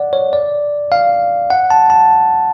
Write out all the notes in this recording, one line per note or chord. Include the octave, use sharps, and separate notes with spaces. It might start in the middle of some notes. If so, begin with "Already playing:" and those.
Already playing: D5 F#5
C#5
D5
F5
F#5
A5
A5